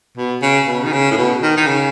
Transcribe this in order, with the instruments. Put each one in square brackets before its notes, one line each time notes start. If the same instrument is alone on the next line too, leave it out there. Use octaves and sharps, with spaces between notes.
[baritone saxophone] B2
C#3
B2
D#3
C#3
A2
B2
D#3
D#3
C#3